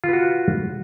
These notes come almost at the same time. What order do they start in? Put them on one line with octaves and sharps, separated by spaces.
F4 B4 F#4